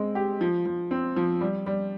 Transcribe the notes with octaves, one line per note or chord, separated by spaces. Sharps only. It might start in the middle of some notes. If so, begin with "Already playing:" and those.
Already playing: G#3 C4
G4
F3
F3
C4
F3
G3
G3